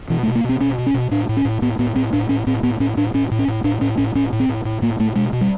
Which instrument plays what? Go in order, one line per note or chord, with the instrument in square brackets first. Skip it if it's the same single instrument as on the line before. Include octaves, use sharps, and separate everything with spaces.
[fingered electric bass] B2 E3
A3
B2
A#3
B2 C4
B2 C#4
B2
C#4
B2
A2 D4
A2
C#4
A2
A2 B3
A2 B3
A2 C4
A2 D4
A2 C#4
A2 C4
A2 B3
A2 C#4
A2 D4
A2 C#4
A2
C#4
A2
A2 D4
A2 C#4
A2 C#4
A2 C#4
A2
C4
A2
A2
A2 A#3
A2 A3
B2 G#3
B2
G3